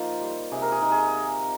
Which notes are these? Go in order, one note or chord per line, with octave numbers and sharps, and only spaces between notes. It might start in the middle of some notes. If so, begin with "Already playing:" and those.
Already playing: F3 A#3 D#4 F4 C5
G3
C3 G#4
A#4
G#4
D#4 A#4
G#4